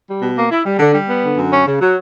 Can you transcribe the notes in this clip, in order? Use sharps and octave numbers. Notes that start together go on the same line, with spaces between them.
G3
B2
A#3
E4
G3
D3
G3
B3
D3
F#2
C#4
C#3
F#3